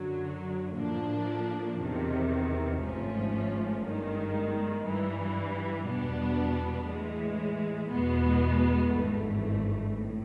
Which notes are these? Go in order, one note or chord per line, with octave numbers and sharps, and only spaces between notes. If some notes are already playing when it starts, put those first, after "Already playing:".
Already playing: F#2 D3 F#3
A2 F3 A#3 D4
E2 C3 D#3
G#1 G#2 F3 A3 C#4
G1 G2 D#3 G#3
G2 E3 G3
E2 B2 G3 B3 D4
A2 E3 G#3
E2 B2 G#3 B3
G#1 G2 E3 A3
A2